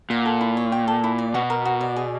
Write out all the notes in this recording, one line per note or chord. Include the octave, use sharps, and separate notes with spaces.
A#2 F#5
A4
E4
C#5
G5
A4
E4
D5
B2 F#4
A#4
F#4
D5
G#4